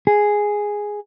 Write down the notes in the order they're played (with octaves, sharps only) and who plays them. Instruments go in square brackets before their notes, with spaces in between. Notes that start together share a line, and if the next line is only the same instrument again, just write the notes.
[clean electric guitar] G#4